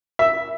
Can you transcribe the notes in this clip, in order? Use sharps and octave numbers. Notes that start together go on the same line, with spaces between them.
E5